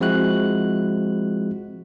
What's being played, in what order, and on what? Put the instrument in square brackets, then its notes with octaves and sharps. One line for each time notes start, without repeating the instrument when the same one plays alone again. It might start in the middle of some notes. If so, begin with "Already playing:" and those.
[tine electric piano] F3 G#3 C4 E4 F#4 F#6